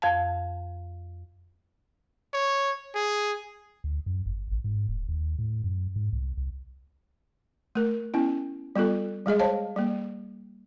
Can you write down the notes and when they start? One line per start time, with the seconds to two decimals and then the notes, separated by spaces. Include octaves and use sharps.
0.02 F2 F5 A5
2.33 C#5
2.95 G#4
3.84 D2
4.06 F#2
4.26 G1
4.52 A1
4.64 G#2
4.88 D#1
5.09 D#2
5.39 A2
5.64 F#2
5.96 G#2
6.13 C2
6.37 C2
7.75 A3 A#4
8.14 B3 C#4 E4
8.76 G3 B3 F4 A4
9.26 G3 G#3 G#4 D#5
9.39 C5 C#5 D#5 F5 A5
9.76 G3 A#3